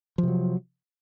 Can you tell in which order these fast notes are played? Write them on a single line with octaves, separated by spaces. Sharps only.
F3 C3 F#3